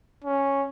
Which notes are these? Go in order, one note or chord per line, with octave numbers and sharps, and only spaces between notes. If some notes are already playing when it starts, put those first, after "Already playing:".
C#4